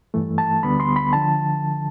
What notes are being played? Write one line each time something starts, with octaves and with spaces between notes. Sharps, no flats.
G2 E3 A3
A5
D2 D3 G3 B3 B5
C6
B5
D3 F3 A5